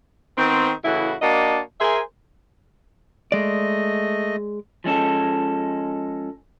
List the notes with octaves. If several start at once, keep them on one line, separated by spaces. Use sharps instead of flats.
D#3 B3 C4
A2 C#3 E3 E4 F#4
A#3 D4 F#4 D#5 A5
G#4 A#4 C5 E5 G#5
G#3 A3 D5 D#5
F3 G#3 C#4 A4